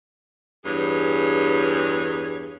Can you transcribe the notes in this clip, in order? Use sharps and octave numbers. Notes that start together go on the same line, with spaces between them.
E2 G2 G#4 C#5